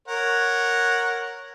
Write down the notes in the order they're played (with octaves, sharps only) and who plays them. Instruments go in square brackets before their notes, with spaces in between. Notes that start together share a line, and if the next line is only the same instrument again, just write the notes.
[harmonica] A#4 C#5 F#5